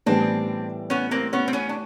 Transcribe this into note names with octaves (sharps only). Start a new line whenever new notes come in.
A2 E3 G3 B3 C4 D4
B3 C#4
A#3 C4
B3 C#4
C4
B3 C#4
D4